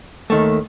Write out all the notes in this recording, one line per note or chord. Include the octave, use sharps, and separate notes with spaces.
D#2 D#3 A3